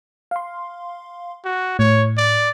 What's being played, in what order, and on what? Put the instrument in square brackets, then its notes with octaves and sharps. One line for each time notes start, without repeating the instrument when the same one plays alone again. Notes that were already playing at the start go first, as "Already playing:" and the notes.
[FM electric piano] F5 C6
[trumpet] F#4
[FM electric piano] A2 [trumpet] C#5
[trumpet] D5